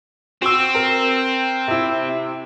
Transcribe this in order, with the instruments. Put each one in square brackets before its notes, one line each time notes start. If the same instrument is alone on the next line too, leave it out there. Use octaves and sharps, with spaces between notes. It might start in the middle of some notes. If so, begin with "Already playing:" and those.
[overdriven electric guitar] C4 [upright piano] F#4 E6
[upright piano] A#4
C3 E4